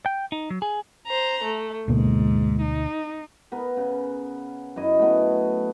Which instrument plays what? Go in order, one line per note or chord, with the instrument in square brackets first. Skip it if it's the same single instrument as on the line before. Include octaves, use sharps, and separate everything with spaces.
[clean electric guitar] G5
D#4
F#3
G#4
[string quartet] C5 A#5
A3
[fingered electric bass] D2 B2 A#3 [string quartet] G#2
[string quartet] D#4
[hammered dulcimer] B3 A#4 B5
C#3
F#2 E4 D#5
A3 B3